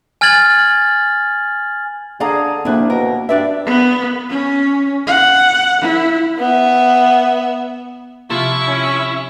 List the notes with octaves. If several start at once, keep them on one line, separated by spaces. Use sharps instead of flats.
G#5 F6 G#6 A6 F#7
D3 G#4 D5 F5 A#5
D2 A#3 C4 D4 E4
B2 A#4
G2 D4 D5 E5
B3
C#4
F#5
E4
B3 E5
C3 F3 E4 F4 C#6
C#4